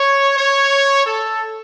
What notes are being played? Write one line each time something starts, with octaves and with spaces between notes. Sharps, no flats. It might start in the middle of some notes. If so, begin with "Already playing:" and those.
Already playing: C#5
C#5
A4